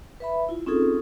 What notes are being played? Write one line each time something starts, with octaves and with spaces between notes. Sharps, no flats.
B4 E5 B5
E4 F4
C4 C#4 D#4 F4 G#4 A4